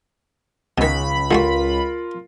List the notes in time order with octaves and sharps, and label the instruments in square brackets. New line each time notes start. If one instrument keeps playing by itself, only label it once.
[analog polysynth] C#2 B5 [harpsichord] B2 D#3
[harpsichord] D3 G3 F#4 [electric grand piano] F4 A#4